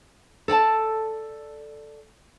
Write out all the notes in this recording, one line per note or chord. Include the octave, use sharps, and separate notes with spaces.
A4 D5 G5 A5